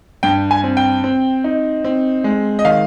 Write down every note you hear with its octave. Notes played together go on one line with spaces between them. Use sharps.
G2 G5
G#5
C4
G5
C4
D#4
C4
G#3
D#5
D#3 F5